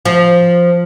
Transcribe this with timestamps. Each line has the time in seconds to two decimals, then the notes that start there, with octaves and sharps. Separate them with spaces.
0.05 F3